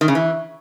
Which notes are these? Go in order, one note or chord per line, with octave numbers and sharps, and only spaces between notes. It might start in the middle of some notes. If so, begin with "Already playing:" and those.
D#3
C#3
E3